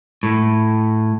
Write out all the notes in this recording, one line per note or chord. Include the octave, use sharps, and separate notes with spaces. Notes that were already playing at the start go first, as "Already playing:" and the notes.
A2